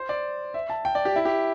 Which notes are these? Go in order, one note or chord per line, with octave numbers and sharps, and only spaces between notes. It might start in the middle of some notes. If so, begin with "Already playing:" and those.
Already playing: C5
D5
E5
A5
G5
D5
G4
E4
G4